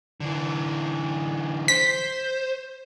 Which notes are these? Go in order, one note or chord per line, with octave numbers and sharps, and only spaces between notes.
D3 E3
C5 B6